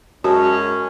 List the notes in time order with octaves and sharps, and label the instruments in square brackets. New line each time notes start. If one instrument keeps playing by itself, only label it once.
[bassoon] F#2 [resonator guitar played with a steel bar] G#3 A5 [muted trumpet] C#4 [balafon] F#4